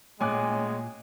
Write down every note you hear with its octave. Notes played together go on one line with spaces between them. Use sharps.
A1 A#2 G#3 G#5 D6 F#6